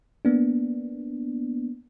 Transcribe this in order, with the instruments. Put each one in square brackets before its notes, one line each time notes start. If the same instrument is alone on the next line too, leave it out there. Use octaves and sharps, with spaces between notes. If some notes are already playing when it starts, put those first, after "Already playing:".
[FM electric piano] A#3 B3 D4